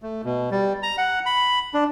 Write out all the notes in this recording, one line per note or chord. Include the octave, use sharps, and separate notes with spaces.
A3
B2
G3
A#5
F#5
B5
D4